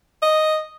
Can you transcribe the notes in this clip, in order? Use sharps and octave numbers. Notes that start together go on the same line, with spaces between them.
D#5